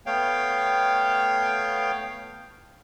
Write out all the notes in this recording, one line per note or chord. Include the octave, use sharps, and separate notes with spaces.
A3 B3 C#5 F5 G5